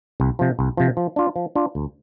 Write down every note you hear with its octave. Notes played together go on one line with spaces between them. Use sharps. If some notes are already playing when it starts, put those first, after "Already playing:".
C2
C3 F3
C2
C3 F3
F3
D4 F4
F3
D4 F4
D2